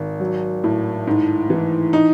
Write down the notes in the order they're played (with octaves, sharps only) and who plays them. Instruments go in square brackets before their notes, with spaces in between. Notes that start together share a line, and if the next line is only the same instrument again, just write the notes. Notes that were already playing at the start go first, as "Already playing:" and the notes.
Already playing: [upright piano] G#1
F#3
A2
G#2
E3
D#4